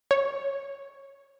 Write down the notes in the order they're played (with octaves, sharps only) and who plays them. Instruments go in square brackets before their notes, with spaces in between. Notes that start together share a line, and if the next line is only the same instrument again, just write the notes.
[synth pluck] C#5